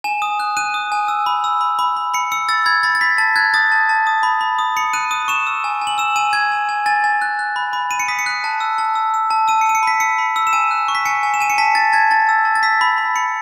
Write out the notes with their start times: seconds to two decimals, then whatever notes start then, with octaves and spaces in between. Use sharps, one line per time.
0.04 G#5 E7
0.22 D#6
0.40 F#6
0.57 F#6 D#7
0.74 D#6
0.92 G#5
1.08 E6
1.26 B5
1.44 E6
1.61 B5
1.79 B5
1.97 B5
2.14 B5 C#7
2.32 E6 C#7
2.49 E6 A6
2.66 B5 G#6
2.83 B5 A6
2.95 A6
3.01 B5 B6
3.18 A5 A6
3.36 F#6 G#6
3.54 D#6 A6
3.72 A5
3.89 A5
4.07 D#6
4.23 B5
4.41 B5
4.59 D#6
4.77 B5 C#7
4.93 F#6 D#7
5.11 D#6 D#7
5.28 C#6 E7
5.47 E6
5.64 G#5
5.82 G#5
5.87 F#7
5.98 E6 E7
6.16 G#5 D#7
6.33 G#5 G#6
6.51 G#5
6.69 G#5
6.86 G#5 A6
7.04 G#5
7.22 F#6
7.39 F#6
7.56 B5
7.73 B5
7.91 B5 D#7
8.00 C#7
8.08 D#6 B6
8.19 C#7
8.26 F#6
8.44 A5
8.60 E6
8.78 A5
8.95 E6
9.14 E6
9.30 A5
9.48 E6 D#7
9.61 C#7
9.66 E6 D#7
9.75 C#7
9.83 B5 B6
10.00 E6 C#7
10.18 B5
10.36 E6
10.47 E7
10.53 G#5 D#7
10.71 F#6
10.88 C#6
10.95 B6
11.06 G#5 C#7
11.23 G#5
11.34 E7
11.41 G#5 D#7
11.50 C#7
11.58 A5 B6
11.75 A5 A6
11.93 A5 G#6
12.11 A5 A6
12.29 E6
12.45 A5
12.55 A6
12.63 E6 B6
12.81 B5
12.98 B5
13.16 B5 C#7